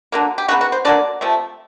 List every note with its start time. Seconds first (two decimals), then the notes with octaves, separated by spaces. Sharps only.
0.12 D3 F#3 A#3
0.38 G4
0.48 C#3 F#3 B3 F#4
0.61 F#4
0.72 C5
0.85 D3 F#3 A#3 D5
1.21 C3 F3 A3